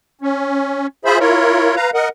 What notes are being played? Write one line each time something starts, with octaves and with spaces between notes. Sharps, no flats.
C#4
F4 G#4 C5 E5 B5
E4 F4 A#4 C#5
B4 F5 A#5
A#4 D#5 F#5